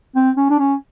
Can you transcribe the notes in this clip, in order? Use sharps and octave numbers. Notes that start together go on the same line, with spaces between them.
C4
C#4
D4
C#4